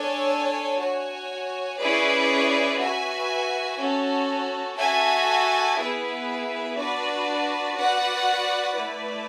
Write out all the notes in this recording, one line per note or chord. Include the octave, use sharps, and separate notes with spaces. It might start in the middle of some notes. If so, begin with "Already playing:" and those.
Already playing: D4 A4 C#5 G#5
F#4 C#5 G#5
C#4 E4 G#4 B4 D5
F#4 B4 E5 G#5
C#4 F#4 A4
F#4 A4 E5 G#5
B3 E4 G#4 B4 E5
D4 F#4 B4 D5
F#4 B4 D5 F#5
A3 E4 B4 D5